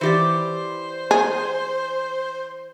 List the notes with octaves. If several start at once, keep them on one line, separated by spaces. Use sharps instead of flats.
E3 G4 C5 D5
G#4